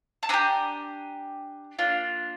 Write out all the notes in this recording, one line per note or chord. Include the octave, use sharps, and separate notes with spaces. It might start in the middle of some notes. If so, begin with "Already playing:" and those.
A5
D4 G4 G#5 A#5
A#3 D4 F4